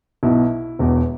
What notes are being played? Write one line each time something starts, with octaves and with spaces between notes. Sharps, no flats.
B1 B2 E4
E1 E2 B2